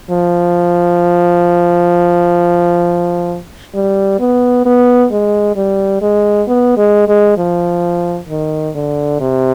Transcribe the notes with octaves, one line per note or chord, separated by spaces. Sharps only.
F3
G3
B3
B3
G#3
G3
G#3
B3
G#3
G#3
F3
D#3
D3
C3